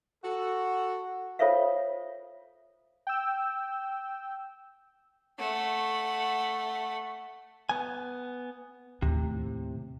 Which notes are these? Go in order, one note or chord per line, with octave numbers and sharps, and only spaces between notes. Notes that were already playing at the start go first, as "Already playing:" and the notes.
F#4 A4
F4 A4 C5 C#5 E5 F5
G5 E6
A3 F#5
B3 G#5
D#2 A2 C3